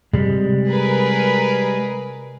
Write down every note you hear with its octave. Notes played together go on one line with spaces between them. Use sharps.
C3 G3 G#3
G#4 A#4 B4